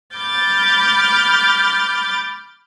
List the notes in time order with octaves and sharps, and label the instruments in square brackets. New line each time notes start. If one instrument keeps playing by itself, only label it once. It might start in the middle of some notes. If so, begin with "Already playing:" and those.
[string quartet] B5 D6 F6 G6 A6